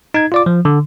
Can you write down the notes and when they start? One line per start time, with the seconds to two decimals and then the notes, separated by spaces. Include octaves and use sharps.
0.14 D#4 G#6
0.32 F4 D5 D6
0.46 F3
0.65 D3